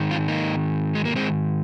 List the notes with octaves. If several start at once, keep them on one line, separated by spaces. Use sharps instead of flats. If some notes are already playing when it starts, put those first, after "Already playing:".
Already playing: G#2 D#3
C4 F4
A#3 D#4
G#3
A#3
G#3 C4